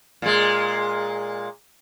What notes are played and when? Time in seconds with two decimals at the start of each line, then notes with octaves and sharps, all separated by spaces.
0.22 A#2 G#3